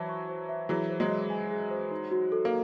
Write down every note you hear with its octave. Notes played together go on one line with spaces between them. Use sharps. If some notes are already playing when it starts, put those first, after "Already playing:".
Already playing: E3 F#3 C5 E5 A5
C#6
C5
E5
E3 F#3 G#4
C5
F#3 G#3
D#5
G#5
G#4
C5
D#4
F#4
A4
A#3